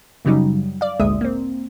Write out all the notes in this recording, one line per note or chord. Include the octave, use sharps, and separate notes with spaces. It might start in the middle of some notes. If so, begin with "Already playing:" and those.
F#2 C#3 F#3 G3 D#4
D5 F5
G#1 D2 A#2 G#3 E5 D#6
A#3 C4